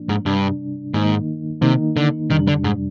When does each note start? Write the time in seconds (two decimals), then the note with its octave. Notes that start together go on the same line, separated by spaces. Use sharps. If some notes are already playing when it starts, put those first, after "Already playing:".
Already playing: A#2 F3 A#3 D4
0.09 G#2
0.26 G2 C3 G3 D4
0.94 G#2 D#3 A#3 D#4
1.62 C3 D#3 A#3 D#4
1.97 D3
2.30 F2 C3 D#3 G3 D4
2.48 D3
2.64 G#2